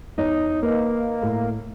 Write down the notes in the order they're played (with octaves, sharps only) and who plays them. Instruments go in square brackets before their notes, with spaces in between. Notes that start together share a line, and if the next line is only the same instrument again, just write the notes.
[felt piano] E2 C#5 [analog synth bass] D#4
[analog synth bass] A#3 [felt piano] A#4 B4 D#5
[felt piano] A2